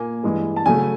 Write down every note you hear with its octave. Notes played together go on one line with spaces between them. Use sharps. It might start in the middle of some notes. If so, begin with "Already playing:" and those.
Already playing: A#2 A#3 G#5
G2 E3 G#3
A5
C#3 F#3 A3 G#5